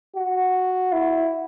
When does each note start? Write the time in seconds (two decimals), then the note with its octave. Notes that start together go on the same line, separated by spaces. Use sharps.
0.16 F#4
0.92 E4